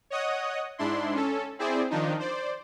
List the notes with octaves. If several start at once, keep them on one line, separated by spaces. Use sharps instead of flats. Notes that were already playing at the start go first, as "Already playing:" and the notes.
C#5 D#5 F#5 D#6
G#2 D4 E4 C6
C#4 A4
C4 E4 G#4 C5 D5
D#3 F3 D4 D#4
C5 D5